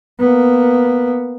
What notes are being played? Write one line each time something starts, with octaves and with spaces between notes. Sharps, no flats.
A#3 B3